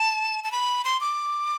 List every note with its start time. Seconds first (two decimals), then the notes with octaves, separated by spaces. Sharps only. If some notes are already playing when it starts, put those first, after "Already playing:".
Already playing: A5
0.44 A5
0.52 B5
0.85 C6
1.01 D6